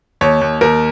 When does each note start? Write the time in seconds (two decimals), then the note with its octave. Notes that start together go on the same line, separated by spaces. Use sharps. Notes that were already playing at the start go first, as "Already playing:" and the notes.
0.21 D#2 C#5
0.41 D#2
0.61 D#2 A#4